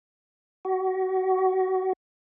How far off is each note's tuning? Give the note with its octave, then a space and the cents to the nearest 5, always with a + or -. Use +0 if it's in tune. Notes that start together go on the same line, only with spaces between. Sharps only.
F#4 +25